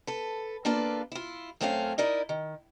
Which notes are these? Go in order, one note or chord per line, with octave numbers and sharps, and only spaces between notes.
A4 B4
A#3 D4 F4 A4 B4 D5
E4 F4
F#2 A3 C4 C#4 G#4 F5
D#4 E4 A#4 D5 D#5
D#3